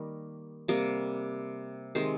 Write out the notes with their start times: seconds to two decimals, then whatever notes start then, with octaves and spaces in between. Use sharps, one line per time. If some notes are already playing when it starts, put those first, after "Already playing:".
Already playing: D#3 G3 A#3
0.68 C3 G3 A#3
1.95 C3 D#3 G#3 C5